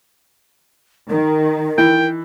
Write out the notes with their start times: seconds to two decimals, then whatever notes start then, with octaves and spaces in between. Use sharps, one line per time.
1.10 D#3 A#4
1.78 E3 G5